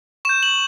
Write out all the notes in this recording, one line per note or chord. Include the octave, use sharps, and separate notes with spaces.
C#6 G6 E7
F#7